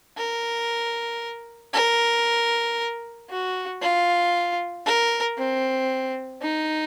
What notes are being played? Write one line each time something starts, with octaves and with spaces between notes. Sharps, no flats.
A#4
A#4
F#4
F4
A#4
C4
D#4